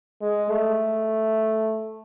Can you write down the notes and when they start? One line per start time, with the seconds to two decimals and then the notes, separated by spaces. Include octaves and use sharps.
0.22 G#3
0.50 A3